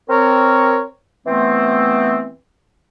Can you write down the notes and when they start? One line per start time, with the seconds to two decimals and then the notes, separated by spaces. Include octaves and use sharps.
0.10 C4 A#4 C#5
1.27 E3 A3 B3 C4